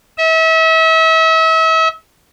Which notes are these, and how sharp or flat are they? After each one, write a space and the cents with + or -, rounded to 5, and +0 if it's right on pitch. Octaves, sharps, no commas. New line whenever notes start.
E5 -35